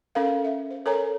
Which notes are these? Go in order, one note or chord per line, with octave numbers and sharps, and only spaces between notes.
C#4 A4 A#4 F5
E5
C5
A4 A#4 C#5 G#5 A#5